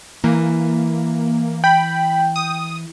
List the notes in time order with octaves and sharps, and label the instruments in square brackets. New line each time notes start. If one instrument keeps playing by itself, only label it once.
[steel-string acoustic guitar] E3 [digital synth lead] A#3
[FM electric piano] G5 [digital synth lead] B5
[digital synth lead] D#6